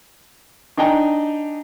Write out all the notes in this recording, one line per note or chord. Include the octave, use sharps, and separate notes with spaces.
D4 D#4 G5 G#5 A#5